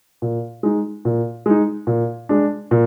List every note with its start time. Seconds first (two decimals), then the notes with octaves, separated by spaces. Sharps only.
0.22 A#2
0.63 G#3 D#4
1.05 A#2
1.46 G#3 D#4
1.87 A#2
2.29 G#3 D4
2.71 A#2